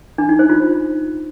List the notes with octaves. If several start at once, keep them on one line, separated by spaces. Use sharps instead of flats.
D4
D#4
C5
F4